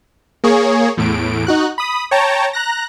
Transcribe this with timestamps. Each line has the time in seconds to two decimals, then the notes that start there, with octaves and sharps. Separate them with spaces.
0.44 A#3 G#4 C#5
0.97 E2 A2 D7
1.47 D#4 F#4 F#6
1.78 B5 D#6
2.11 C#5 G5 A5 A#5
2.53 A#5 F#6 A#6